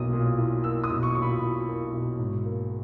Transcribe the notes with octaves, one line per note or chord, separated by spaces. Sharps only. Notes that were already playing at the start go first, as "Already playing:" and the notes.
Already playing: B1 A#2 A#3 E4 D#6
A#2
E4
A#3 E6
D#6
B1
C#6
A#2 C#6
B5
E4
A#3
B1
G#2
A#3